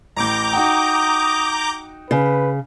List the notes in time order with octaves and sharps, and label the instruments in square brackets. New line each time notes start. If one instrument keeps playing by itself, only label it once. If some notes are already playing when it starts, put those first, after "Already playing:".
[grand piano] A1 A2 [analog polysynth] A#5 D6 G6
[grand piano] D#4 F#4 G5 [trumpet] D#6
[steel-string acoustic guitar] C#3 [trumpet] B4